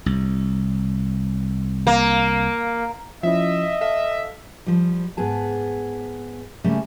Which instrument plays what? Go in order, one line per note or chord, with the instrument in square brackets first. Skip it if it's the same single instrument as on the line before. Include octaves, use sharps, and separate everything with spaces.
[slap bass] C2
[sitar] A#3
[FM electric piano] F3 C#4 E4 [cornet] D#5 [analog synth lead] E5
[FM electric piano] A4 F5 [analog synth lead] E5
[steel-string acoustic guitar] F3 G3
G#2 B3 G#4 A5
C#3 G3 A3 A#3 C#4 G4